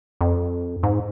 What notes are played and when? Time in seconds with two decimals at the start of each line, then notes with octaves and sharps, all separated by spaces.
0.21 F2
0.83 G#2